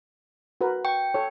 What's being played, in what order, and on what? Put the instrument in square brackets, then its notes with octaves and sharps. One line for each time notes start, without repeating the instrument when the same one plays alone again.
[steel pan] F#4 A#4 B4
[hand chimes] G5 [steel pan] C#6
[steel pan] A4 C#5